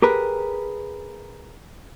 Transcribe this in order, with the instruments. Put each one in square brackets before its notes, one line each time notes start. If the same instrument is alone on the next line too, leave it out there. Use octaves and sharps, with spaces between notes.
[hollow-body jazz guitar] G4 G#4 A#4 B4